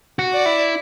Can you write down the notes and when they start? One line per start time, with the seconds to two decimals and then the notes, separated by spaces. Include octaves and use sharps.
0.19 F#4
0.33 D5
0.46 E4